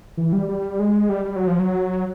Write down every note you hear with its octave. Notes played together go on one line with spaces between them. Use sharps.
E3
G3
G3
G#3
G3
G3
F#3
F3
F#3